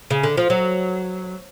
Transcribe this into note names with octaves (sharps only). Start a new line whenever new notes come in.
C#3
D3
F3
F#3